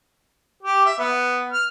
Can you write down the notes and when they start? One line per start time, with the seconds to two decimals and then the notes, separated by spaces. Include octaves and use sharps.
0.63 G4
0.86 E5
0.99 B3
1.52 F6